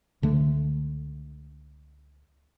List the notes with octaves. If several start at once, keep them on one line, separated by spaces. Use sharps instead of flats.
C#2 D3 A3